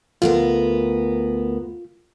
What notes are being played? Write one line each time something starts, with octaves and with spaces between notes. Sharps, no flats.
D2 B3 F4 A#4